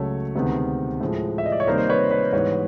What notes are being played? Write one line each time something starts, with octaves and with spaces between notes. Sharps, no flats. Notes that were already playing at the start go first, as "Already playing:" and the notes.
Already playing: C#2 C#3 F#3 A3 C#5
D2 C3 D#3 G#3 B3
A2 F3 G#3
E5
D#5
D5
C#5
C3 D#3 G3 A#3 D#4 A#4 C5
C5
B4 C#5
B4 C#5
G#2 E3 G3 B3 B4 C#5